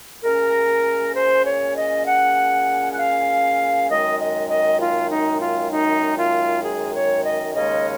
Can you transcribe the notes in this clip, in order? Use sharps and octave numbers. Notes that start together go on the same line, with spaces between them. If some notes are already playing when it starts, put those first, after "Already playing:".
A#2 G#3 C#4 A#4
C5
C#5
D#5
F#5
F#5
F5
F#2 D#3 G#3 D#5
D#5
D#5
F4
D#4
F4
D#4
F4
G#4
C#5
D#5
D#2 C#3 G#3 C#4 D#5